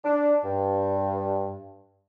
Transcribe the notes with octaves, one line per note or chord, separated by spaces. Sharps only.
D4
G2